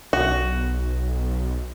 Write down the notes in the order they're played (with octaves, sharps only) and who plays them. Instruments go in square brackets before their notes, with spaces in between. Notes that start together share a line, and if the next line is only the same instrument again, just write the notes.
[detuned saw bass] B1 [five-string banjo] F#4